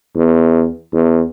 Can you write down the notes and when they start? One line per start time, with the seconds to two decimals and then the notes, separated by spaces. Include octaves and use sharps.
0.16 E2
0.93 E2